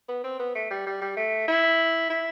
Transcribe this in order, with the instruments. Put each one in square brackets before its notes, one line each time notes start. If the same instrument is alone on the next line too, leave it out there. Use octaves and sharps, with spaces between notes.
[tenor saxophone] B3
C4
B3
A3
G3
G3
G3
A3
E4
E4